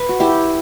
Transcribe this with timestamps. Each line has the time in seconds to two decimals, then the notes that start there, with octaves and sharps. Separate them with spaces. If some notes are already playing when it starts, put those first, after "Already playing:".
Already playing: B4
0.09 F#4
0.20 E4 G4